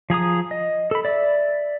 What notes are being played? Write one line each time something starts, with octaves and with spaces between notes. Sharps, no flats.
F3 G#4 A#5 D#6
D#5
A4 B5
D5 E5